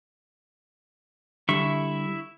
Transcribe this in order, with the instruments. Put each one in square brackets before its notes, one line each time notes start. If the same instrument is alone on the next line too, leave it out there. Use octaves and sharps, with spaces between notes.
[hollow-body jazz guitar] D3 G3 [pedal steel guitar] E4 E5 C#6